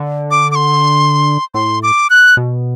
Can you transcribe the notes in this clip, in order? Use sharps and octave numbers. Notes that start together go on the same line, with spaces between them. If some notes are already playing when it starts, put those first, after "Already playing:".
Already playing: D3
D6
D6
C6
A2 C6
D6
F#6
B2